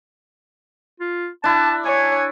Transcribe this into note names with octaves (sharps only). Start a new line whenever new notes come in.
F4
D4 E4 A5
C#5 G#5